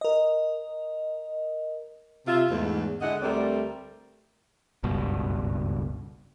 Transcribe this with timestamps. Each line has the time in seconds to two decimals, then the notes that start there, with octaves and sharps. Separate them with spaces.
0.01 A#4 D#5
2.26 C3 F4 E5
2.50 E2 G#2 A3
3.01 D3 G#3 E4 D#5 F#5
3.22 D2 G3 A3 C4 A#4 D5
4.83 F#1 C#2 G2 B2